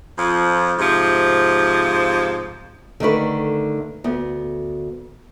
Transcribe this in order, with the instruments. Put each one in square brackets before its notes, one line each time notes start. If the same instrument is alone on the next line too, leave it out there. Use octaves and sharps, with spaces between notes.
[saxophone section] F2 F3
G#2 C3 F3
[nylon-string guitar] D3 D#3 A3 B4
D2 B3